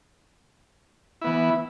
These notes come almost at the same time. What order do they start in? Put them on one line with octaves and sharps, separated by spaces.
E4 B3 E3